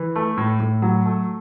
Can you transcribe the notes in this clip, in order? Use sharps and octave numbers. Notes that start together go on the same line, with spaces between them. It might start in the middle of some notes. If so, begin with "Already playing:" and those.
Already playing: E3
A3
A2
A2
F#3
A3